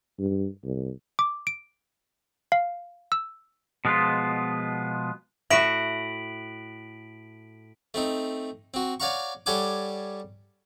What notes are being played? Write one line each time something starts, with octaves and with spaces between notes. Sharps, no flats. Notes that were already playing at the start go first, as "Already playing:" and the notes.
G2
C2
D6
D7
F5
E6
B2 F3 G#3 A3 B3 F4
A2 F#4 E5 B6 D7 F#7
A3 C4 D#4
C4 F#4
C#5 D5 F5 F#5 A#5 C#6
G3 A4 C#5 F#5 G#5 D6